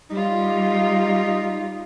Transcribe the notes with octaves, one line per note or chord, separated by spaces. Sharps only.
G3 D#4 F4